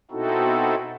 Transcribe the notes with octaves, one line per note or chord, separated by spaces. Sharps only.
B2 C4 D#4 E4 F#4 A4